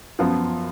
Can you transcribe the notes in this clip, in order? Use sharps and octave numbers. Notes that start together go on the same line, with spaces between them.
F#2 F3 B3 F4